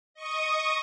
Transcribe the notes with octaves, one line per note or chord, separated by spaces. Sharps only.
D#5 C#6 D#6